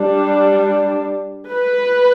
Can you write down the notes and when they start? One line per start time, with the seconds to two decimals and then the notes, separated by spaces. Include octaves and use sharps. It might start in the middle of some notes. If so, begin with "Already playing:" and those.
Already playing: G3 D4
1.50 B4